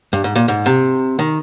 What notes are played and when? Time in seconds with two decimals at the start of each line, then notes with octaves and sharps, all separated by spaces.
0.13 G2
0.24 G#2
0.36 A#2
0.48 G#2
0.66 C3
1.19 D#3